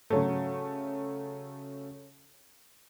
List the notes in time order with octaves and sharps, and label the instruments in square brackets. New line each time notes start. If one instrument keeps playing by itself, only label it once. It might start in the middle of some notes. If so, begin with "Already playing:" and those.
[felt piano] C#3 F#3 A3